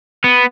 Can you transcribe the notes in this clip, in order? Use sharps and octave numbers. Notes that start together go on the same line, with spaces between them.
B3